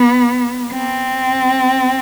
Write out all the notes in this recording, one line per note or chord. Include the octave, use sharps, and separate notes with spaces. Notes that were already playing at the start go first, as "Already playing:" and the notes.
Already playing: B3
C4